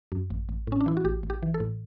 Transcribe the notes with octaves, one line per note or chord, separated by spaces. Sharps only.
F#2
A1
A1
A2 C#4
D4
E3 E4
F#4
A1 G4
A1
G4
E3
A4
A2